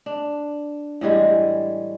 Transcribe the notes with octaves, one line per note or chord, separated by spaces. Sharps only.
D4
A2 E3 G3 G#3